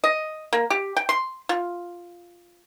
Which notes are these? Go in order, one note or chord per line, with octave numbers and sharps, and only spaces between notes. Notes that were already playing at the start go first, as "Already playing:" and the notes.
D#5
A#3
G4
G5
C6
F4